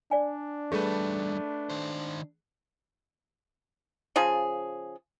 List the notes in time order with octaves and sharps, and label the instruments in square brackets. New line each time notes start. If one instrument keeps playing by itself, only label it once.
[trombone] D4 [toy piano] D5 G#5
[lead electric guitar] E2 G3 [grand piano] A3 B4 [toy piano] G#4
[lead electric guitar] D#3 C5
[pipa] C#3 F3 G#4